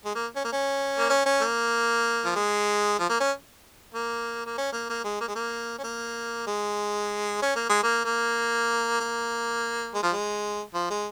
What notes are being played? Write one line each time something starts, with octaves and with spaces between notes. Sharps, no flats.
G#3
A#3
C#4
A#3
C#4
A#3
C#4
C#4
A#3
F3
G#3
F3
A#3
C#4
A#3
A#3
C#4
A#3
A#3
G#3
A#3
G#3
A#3
C#4
A#3
G#3
C#4
A#3
G#3
A#3
A#3
A#3
G#3
F3
G#3
F3
G#3